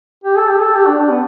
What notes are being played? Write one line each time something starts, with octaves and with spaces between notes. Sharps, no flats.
G4
A4
G4
A4
G4
D4
D4
B3